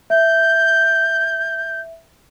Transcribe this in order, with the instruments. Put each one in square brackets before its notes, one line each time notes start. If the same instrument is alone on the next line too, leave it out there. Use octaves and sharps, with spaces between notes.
[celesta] E5 [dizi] G6